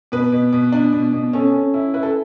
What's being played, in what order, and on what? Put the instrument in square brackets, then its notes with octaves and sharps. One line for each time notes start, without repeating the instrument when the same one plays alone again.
[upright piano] B2 B4
B2
B2
D4
B2
B2
C#4 A4
C#4
E4
E4 B4
A4